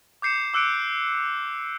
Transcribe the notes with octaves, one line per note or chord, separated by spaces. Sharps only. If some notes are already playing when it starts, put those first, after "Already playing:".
D6 G6 C7 C#7 E7
D6 E6 F#6 C#7 D7